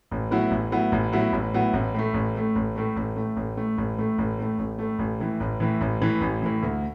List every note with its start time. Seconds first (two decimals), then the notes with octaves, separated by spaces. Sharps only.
0.11 A1
0.31 A2 F#3 B3 E4
0.51 A1
0.72 A2 F#3 B3 E4
0.92 A1
1.12 A2 F#3 B3 E4
1.32 A1
1.54 A2 F#3 B3 E4
1.73 A1
1.94 A2 A3
2.14 A1
2.35 A2 A3
2.55 A1
2.76 A2 A3
2.96 A1
3.16 A2 A3
3.36 A1
3.57 A2 A3
3.78 A1
3.98 A2 A3
4.18 A1
4.39 A2 A3
4.58 A1
4.79 A2 A3
4.99 A1
5.20 A2 E3
5.40 A1
5.60 A2 E3
5.81 A1
6.01 A2 E3
6.21 A1
6.42 A2 E3
6.63 D2